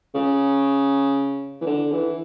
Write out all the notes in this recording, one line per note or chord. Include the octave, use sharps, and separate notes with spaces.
C#3
E3
D3
E3